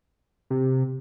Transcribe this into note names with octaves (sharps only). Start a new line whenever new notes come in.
C3